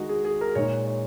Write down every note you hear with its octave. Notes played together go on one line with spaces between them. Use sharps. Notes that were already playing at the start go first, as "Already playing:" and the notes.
Already playing: D#3 G#3 D#4 F#4 D#5
G#4
G#4
A#4
A#2 G#3 D#4 C#5
C#5